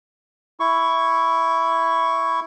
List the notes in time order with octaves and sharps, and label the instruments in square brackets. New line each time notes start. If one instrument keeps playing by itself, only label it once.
[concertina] E4 C#6